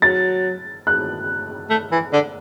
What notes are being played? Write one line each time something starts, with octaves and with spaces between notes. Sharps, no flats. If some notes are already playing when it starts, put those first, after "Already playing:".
F#3 A6
F#6
A3
E3
D3